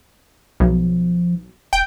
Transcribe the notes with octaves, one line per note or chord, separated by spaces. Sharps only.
B1 F3
E1 G5